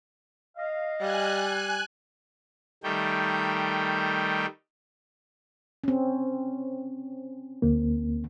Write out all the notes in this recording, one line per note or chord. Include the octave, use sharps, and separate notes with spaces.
D#5 F5
G3 G#5 F#6
D#3 G3 A3 G5
C4 C#4
D2 A#3